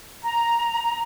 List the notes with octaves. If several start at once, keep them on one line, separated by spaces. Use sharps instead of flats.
A#5